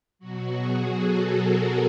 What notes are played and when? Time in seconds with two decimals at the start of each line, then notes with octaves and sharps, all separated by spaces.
0.19 B2 F#3 F#4
0.56 G#4
0.92 A4
1.29 A#4